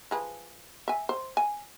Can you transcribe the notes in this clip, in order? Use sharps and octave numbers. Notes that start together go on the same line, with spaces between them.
F3 G#4 B4
E5 G#5
C5
G#5